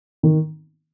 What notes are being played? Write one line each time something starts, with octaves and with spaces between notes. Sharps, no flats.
D#3